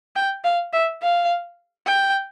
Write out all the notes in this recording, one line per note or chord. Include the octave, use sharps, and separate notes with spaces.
G5
F5
E5
F5
G5